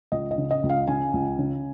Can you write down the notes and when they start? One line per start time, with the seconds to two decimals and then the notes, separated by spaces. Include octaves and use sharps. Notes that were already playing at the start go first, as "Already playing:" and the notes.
0.12 C#2 D#5
0.31 D#5
0.38 C#3
0.51 D#5
0.63 C#2
0.69 F5
0.88 C#3 G#5
1.13 C#2
1.38 C#3